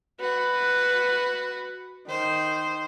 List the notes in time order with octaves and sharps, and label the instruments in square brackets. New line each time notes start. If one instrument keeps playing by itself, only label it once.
[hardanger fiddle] F#4 [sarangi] B4
[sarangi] D#3 [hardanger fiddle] C5